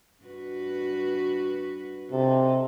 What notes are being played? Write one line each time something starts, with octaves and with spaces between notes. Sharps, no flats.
G2 F#4 B4
C3 D#4 A4